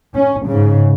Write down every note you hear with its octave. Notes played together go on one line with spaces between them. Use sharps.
C#4
G#2 C#3